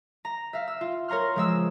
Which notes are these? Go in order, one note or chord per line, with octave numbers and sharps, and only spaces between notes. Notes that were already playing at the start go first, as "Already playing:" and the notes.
A#5
E5 F5
E6
F4
A#4 C#5 A#5 C6 F6
F3 G#3 E6